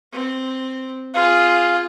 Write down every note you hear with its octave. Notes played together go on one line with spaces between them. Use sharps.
C4
F4 G#4 F5